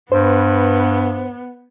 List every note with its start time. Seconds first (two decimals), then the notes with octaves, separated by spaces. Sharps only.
0.12 G2 B3 C5